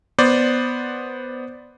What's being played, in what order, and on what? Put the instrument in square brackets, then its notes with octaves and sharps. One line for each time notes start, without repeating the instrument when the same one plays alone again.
[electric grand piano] B3 C5 D5